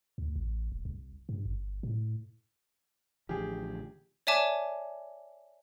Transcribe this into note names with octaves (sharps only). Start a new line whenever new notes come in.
D2
A1
D#1
C2
G2
G1
A2
A1 D3 F3 G4 G#4
C#5 D5 E5 G#5 A5 D6